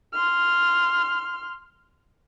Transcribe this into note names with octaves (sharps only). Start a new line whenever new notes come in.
C6 F6